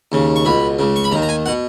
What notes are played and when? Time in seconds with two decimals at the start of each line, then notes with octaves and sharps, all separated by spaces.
0.12 D#2 C#3
0.36 C#6
0.45 C#2 B2 B5
0.79 C#2 C#3
0.96 C#6
1.04 B5
1.11 D#2 A#5
1.15 D#3
1.22 A#5
1.29 G#5
1.46 B2 F#5